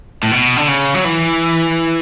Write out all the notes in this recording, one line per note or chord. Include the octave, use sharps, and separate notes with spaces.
A2
B2
D3
C#3
F#3
E3